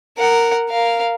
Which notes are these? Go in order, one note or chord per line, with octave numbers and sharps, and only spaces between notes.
A#4 F#5
A#4 F5